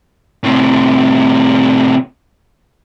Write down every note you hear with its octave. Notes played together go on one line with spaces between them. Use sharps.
A2 C3